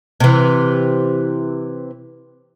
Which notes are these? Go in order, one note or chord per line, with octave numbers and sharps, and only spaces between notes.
C3 E3